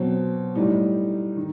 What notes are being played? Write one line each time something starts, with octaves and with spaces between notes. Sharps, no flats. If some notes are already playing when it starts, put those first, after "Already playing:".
Already playing: B2 F#3 C4
A2 G3 D#4
D#3